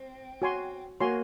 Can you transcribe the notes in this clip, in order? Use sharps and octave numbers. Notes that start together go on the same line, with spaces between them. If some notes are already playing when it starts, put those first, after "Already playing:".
Already playing: C4
F#4 C#5 G#5 C6
A#3 F#4 C#5 G#5 C6